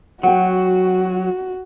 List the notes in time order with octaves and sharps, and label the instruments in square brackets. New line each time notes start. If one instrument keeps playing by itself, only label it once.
[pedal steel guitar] F#3 [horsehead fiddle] F#4 [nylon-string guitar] F#5 G5